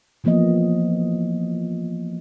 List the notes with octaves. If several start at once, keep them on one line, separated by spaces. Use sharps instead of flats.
E3 F3 A#3 B3 D#5